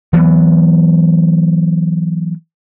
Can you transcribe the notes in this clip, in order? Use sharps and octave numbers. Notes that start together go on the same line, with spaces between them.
E3 F#3 B3